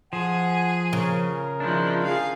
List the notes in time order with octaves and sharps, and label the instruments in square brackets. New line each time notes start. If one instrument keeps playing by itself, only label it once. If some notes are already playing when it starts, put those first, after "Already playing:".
[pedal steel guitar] F3 [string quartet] G#4 [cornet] F#5
[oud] C#3 [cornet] A#4
[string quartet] D#3 F3 E4 [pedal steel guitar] D4
[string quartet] G#4 F5